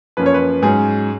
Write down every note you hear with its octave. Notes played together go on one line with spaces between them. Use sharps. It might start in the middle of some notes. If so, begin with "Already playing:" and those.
F#2 F3 A#3 C#4 B4
C#5
B4
G#2 F#3 C#4 G#4